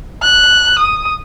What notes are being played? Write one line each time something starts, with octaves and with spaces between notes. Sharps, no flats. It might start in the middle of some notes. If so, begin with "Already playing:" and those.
F#6
D#6